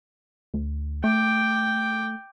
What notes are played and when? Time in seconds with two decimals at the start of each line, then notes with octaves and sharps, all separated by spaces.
0.54 D2
1.04 A3 G5 D6